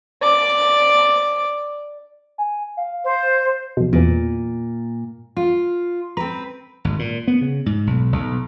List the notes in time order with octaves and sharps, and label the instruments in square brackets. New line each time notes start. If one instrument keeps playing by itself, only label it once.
[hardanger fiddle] D5 D6
[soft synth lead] G#5
F5
[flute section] C5
[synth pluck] A#1 B2
[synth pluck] E2 E3 [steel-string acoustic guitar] A#2
[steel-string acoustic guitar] F4
[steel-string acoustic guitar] C4 B4 [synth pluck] A#5
[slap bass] G#1
A#2
B3
C#3
G#2
B1
B1